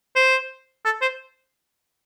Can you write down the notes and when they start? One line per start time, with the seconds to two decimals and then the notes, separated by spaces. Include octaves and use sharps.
0.16 C5
0.85 A4
1.02 C5